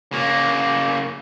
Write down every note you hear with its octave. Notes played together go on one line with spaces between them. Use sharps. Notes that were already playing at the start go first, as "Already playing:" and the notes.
C#3 A#3